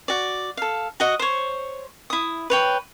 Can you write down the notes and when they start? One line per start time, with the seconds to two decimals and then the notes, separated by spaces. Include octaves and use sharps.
0.08 F#4 D5
0.57 A4 F5
1.00 F#4 D#5 F#5
1.19 C5 C#5
2.10 E4 D#6
2.50 B4 C#5 G5